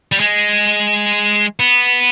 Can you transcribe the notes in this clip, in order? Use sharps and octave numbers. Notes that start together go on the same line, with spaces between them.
G3
G#3
B3